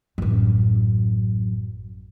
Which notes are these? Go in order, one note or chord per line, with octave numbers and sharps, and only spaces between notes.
A1 F#2